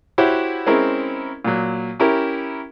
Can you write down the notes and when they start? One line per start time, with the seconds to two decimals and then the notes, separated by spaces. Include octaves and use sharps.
0.18 E4 F#4 G4 C5 C#5 F#5
0.66 G#3 C4 C#4 E4 A#4
1.45 A#2 F#3
2.00 C#4 E4 G4 A#4